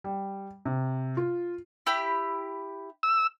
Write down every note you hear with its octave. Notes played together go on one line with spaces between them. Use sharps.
G3
C3
F4
E4 G4 B5
E6